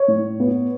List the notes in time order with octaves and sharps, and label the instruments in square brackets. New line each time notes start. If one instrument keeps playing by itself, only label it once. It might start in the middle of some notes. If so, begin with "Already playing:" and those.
Already playing: [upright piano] C#5
A2
B3